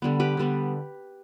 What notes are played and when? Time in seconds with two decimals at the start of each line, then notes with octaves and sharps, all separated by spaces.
0.02 D3 G3 B3
0.20 G4 B4
0.37 D3 G3 B3